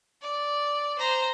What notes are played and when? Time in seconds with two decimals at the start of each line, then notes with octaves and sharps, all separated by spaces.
0.22 D5
0.99 C5 A#5